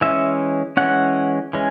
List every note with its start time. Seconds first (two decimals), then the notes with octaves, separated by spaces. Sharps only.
0.01 E3 G#3 C#4 E5
0.77 E3 G#3 C#4 F#5
1.53 E3 G#3 C#4